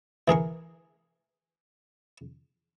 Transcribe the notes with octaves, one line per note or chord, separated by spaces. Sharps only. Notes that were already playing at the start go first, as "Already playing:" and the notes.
E3 G#4 A#4 C#6